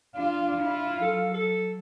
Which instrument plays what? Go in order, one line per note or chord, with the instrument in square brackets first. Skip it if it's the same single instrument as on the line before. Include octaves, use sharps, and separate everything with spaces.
[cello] D4 F4 [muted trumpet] F5
[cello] E4 F4
[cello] F#3 [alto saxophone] A4
[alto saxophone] A4